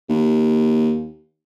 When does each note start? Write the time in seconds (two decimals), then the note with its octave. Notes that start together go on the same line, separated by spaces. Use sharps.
0.09 D#2